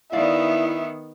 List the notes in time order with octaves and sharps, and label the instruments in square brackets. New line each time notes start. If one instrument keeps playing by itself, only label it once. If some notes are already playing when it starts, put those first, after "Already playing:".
[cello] D#3 B3 [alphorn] E4 [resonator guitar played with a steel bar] D5 F5 [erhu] E5